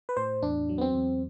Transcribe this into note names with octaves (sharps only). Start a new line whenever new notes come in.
B4
A2 C5
E2 D4
F#3
B3
C4
E2